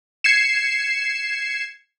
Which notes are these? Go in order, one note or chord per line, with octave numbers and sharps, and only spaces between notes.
G#6 C7 C#7 E7